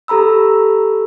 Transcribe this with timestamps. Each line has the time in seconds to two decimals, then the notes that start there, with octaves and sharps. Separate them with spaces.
0.08 G4 A4 A#5 B5 E6